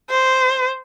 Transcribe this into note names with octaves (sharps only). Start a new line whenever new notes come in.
C5